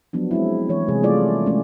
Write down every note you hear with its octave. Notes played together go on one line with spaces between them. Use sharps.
F3 F#3 B3 D4
G#3 C4 E4
E3 A3 C#5
C3 G#3 G#4
C3 G3 A3 E4 F4 D5
G#3 A3 C#4